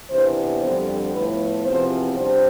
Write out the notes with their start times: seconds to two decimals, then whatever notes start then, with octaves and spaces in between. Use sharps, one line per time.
0.10 C3 E3 B3 D4 C5
0.62 F2 D3 G3 C5
1.13 A2 F3 B3 B4
1.65 E2 C3 F3 C4 C5
2.16 C3 G3 D4 C5